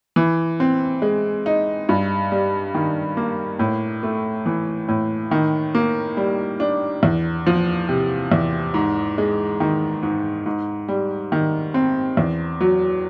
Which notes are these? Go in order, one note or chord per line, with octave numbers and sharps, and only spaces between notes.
E3
C4
G#3
D#4
G2
G3
D#3
A#3
A2
A3
E3
A2
D#3
A#3
G3
D4
E2
F3
C3
E2
G#2
G#3
D#3
G#2
G#2
G3
D#3
C4
E2
F#3